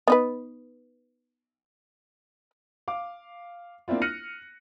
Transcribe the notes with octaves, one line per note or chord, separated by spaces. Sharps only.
B3 D#4 B4
F5 D6
A#3 C4 D4 E4 F4
F6 F#6 A#6 C#7 D#7 F#7